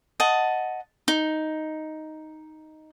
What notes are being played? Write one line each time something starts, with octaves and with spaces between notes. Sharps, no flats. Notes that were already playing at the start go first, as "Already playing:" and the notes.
D#5 F#5 A5
D#4